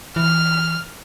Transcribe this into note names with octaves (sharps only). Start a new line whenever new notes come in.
E3 F6